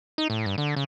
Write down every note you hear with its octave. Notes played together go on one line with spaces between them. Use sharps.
D#4
A2
G2
D3
C#3